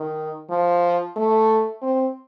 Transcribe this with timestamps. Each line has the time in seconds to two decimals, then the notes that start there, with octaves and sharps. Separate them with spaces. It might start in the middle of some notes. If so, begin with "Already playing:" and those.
Already playing: D#3
0.50 F3
1.16 A3
1.82 C4